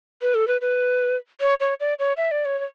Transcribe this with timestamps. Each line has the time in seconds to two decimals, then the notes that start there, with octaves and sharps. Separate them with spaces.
0.22 B4
0.35 A4
0.48 B4
0.61 B4
1.41 C#5
1.60 C#5
1.80 D5
1.99 C#5
2.17 E5
2.31 D5
2.45 C#5
2.59 C#5